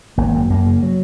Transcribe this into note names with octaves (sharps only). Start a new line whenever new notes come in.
G#1 A#3
F#2
F#2 A#3
C#3
F#3